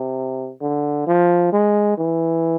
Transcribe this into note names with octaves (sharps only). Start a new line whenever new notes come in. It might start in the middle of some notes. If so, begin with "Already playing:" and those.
Already playing: C3
D3
F3
G#3
E3